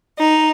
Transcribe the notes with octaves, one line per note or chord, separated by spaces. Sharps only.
D#4